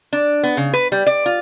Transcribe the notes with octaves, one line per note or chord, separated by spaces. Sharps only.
D4
B3
C#3
B4
G3
D5
F4